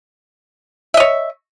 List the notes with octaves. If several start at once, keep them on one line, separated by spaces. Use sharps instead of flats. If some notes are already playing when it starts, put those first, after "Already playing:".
C#5 D#5 E5